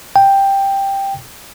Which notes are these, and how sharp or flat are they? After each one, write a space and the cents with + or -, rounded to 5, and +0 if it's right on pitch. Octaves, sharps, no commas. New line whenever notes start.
G5 +5